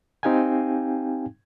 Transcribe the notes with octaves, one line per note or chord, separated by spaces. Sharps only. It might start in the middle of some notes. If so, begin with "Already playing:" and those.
C4 D#4 G4 F5 G5 G#5